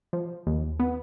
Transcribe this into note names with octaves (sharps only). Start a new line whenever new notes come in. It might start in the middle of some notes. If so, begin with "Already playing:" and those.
F3
D#2
B3